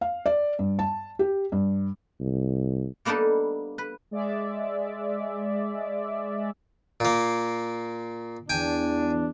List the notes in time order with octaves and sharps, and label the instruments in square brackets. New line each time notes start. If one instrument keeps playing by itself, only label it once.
[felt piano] F5
D5
G2
A5
G4
G2
[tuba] C2
[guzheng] G3 A#3 B3 D4 D#4 A4
B4
[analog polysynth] G#3 D5 E5
[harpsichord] A#2 A#3
[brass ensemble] E2 D4 [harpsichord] G5 G#5